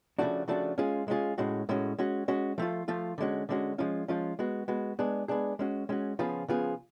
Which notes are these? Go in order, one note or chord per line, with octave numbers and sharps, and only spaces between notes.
C#3 F3 A3 D4 F#4
C#3 F3 A3 D4 F#4
G#3 C#4 F4 G#4
G#3 C#4 F4 G#4
A2 G#3 C#4 F#4
A2 G#3 C#4 F#4
G#3 C#4 F#4
G#3 C#4 F#4
F3 A3 F4
F3 A3 F4
D3 G#3 C#4 F#4
D3 G#3 C#4 F#4
F3 G#3 C#4 F4
F3 G#3 C#4 F4
G#3 B3 F#4
G#3 B3 F#4
G#3 B3 D4 G#4
G#3 B3 D4 G#4
G#3 C#4 F#4
G#3 C#4 F#4
C#3 F3 B3 F4 G#4
C#3 F3 B3 F4 G#4